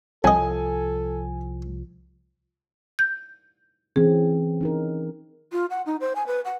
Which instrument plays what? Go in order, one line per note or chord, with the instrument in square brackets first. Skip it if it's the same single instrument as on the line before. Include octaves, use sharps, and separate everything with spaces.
[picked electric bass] C2 F3 [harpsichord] F2 D#5 [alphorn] A4 [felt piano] G#5
[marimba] G6
[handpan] E3 C4 C#4 [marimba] G#4
[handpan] C#4 D#4 A#4
[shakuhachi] F4
F#5
D#4
C5
G#5
B4
F#5